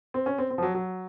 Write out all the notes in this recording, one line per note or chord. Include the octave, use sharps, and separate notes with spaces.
C4
C#4
C4
C4
F3
F#3
F#3